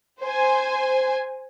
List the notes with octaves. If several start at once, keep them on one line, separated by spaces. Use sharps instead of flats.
C5 G#5